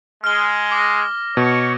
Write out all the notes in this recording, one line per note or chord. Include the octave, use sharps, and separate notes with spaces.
G#3 F6 G7
D6 A#6
B2 C#5 C#6